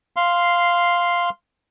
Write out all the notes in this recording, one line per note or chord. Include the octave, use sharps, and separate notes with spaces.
F5 C6